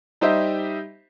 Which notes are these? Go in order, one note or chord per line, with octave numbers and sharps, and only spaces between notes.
G3 D#4 G4 C5 D#5 E5